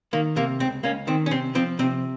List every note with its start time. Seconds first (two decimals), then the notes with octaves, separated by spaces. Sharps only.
0.13 D#3 A#3
0.36 C3 A#3
0.60 C#2 C4
0.83 C#2 A#3 C#4
1.07 D#3 C4
1.26 C#4
1.31 C3 C4
1.55 F3 C4
1.79 C3 C4